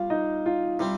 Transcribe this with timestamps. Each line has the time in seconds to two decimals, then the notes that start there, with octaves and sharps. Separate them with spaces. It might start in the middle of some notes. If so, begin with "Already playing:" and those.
Already playing: G3 F4 F5
0.10 D#4 D#5
0.46 F4
0.79 C3 G3 C4 F4